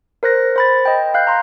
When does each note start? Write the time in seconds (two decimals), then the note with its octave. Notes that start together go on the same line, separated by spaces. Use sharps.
0.23 A#4 C5 F#6 A#6
0.56 C5 B5 A6
0.85 D#5 G5
1.14 F5 F#6 G6
1.27 A#5 C6